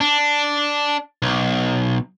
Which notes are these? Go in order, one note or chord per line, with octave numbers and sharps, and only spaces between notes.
D4
B1